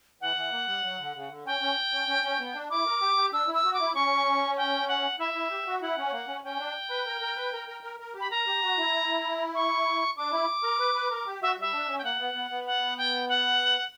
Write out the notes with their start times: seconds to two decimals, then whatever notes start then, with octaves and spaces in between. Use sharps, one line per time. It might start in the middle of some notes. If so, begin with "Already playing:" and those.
0.21 E3 F#5
0.36 E3
0.52 A#3
0.67 G3
0.83 F#3
0.99 D3
1.15 C#3
1.30 D3
1.45 C#4 G5
1.61 C#4
1.93 C#4
2.08 C#4
2.23 C#4
2.39 B3
2.55 D4
2.70 E4 D6
2.86 A#4
3.01 G4
3.17 G4
3.32 D4 E6
3.48 E4
3.54 E6
3.64 F#4
3.74 D6
3.79 E4
3.95 C#4 C#6
4.57 G5
4.88 F#5
5.19 E4 E5
5.34 E4
5.50 G4
5.66 F#4
5.81 E4 F#5
5.97 C#4
6.12 A#3
6.28 C#4
6.44 C#4 G5
6.59 D4
6.90 B4
7.06 A#4
7.21 A#4
7.36 B4
7.53 A#4
7.68 A#4
7.83 A#4
8.00 A#4
8.15 G4
8.20 B5
8.31 A#4 A#5
8.46 G4
8.62 F#4
8.78 E4
9.55 C#6
10.17 D4 D6
10.32 E4
10.63 A#4
10.79 B4
10.94 B4
11.10 A#4
11.27 G4
11.42 F#4 E5
11.58 G3 E5
11.73 D4
11.88 C#4
11.98 G5
12.03 A#3 F#5
12.20 B3
12.34 B3
12.51 B3
12.66 F#5
12.97 G5
13.29 F#5